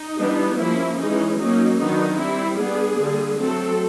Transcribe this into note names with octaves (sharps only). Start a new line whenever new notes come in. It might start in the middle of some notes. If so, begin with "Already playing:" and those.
Already playing: D#4
E3 G3 B3 D4
F3 A#3 C#4 E4
E3 G#3 C#4 D#4
F#3 A#3 C#4 D#4
D#3 F#3 B3 D4 D#4
G3 C4 E4
G3 B3 D4 G#4
D3 G3 A#3
F#3 A3 C4 A4